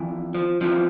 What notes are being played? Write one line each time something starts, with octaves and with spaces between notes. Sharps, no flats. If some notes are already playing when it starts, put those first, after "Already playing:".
Already playing: F2 E3
F3
F2 E3 F3